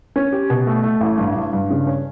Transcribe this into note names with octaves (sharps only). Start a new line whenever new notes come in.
C#4
G4
B2
A3
A3
A1
G2
G2
G2
C#3
C#4